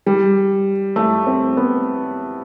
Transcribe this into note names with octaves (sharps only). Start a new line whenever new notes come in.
G3
A3
C4
B3